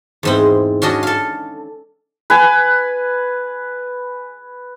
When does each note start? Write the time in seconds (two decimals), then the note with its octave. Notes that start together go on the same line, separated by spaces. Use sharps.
0.23 E2 G#2 C4
0.82 C#4 D4 F#4 D#5
1.03 A4 F5
2.30 B4 G#5